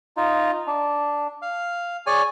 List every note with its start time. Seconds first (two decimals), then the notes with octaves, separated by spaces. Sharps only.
0.17 D#4 F4
0.67 D4
1.42 F5
2.07 G#4 C#5 D5 G#5